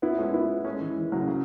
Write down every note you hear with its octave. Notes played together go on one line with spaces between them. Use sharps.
B3 E4
G#3 C#4
B3 E4
G#3 C#4
E3
E3
C#3 F#3
C#3